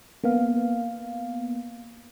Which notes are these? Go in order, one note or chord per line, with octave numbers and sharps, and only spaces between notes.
A#3 B3 F5